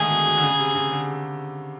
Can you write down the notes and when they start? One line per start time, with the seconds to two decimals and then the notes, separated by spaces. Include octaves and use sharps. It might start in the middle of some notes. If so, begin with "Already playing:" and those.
Already playing: D3 D#3 G#3 A3 G#4
0.09 B2
0.26 B2
0.38 D3
0.43 C#3
0.59 C3
0.75 C#3
0.91 D3